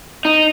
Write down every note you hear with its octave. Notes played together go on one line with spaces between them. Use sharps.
D#4